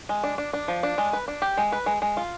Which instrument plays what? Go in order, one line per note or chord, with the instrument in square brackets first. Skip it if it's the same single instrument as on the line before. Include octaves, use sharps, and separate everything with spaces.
[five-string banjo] G#3
D4
D4
D4
F3
D4
G#3
B4
D4
G4
G#3
B4
G#3
G#3
F4